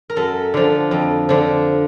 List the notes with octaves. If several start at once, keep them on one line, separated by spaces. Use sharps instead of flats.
A#4
F#2 A4
D3 F3
F2
D3 F3